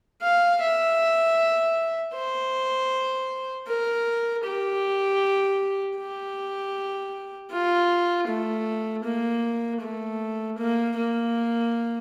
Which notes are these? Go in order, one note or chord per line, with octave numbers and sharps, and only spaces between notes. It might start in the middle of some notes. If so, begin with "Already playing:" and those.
F5
E5
C5
A#4
G4
G4
F4
A3
A#3
A3
A#3
A#3